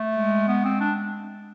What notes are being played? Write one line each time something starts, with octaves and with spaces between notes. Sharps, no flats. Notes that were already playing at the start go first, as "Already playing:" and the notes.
Already playing: A3
G#3
B3
C4
D4